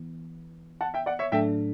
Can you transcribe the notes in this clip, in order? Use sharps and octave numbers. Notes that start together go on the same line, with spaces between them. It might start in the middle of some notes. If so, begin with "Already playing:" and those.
Already playing: E3 B3
F#5 A5
E5 G5
D5 F#5
C#5 E5
A2 F#3 A3 D4 A4 E5 G5